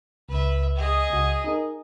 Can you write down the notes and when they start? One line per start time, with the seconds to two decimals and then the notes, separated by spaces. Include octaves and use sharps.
0.29 C#2 B4 E5
0.76 G#4 D#5
1.10 C#2 F#4
1.44 D#4 G#4 A#4